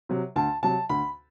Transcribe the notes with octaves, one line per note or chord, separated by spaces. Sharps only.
C3 F#3
D2 A5
C3 F#3 A5
D2 B5